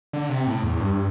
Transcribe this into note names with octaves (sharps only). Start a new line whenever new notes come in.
D3
C3
A2
E2
G2